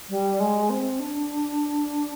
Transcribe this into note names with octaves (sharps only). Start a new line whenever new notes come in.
G3
G#3
C4
D4